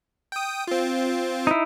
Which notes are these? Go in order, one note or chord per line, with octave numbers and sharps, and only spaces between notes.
G5 D#6
C4 F4
D#4 E4